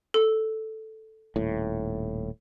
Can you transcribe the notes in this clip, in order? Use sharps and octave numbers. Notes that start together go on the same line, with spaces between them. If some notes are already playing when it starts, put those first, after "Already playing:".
A4
D#1 A2